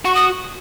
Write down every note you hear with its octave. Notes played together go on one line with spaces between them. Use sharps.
F#4 C#6
D#6